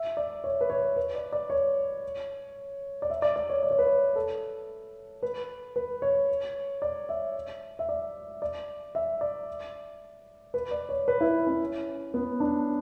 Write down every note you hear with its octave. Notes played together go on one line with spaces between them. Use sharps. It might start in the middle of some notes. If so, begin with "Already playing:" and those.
Already playing: E5
D5
C#5
B4
C#5
B4
D5
D5
C#5
D5
E5
D5
D5
C#5
D5
C#5
B4
C#5
A4
B4
B4
C#5
D5
E5
E5
D5
D5
E5
D5
B4
D5
C#5
B4
E4
C#4
B3
D4